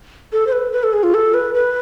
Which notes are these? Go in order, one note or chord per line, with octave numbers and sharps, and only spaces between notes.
A4
C5
B4
B4
A4
G#4
F4
A4
B4
B4